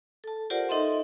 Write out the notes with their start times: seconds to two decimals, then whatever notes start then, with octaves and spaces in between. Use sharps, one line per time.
0.24 A4 A5
0.50 F4 G4 A#4 C5 D5 F#5
0.69 D#4 A4 D#5 E5 C6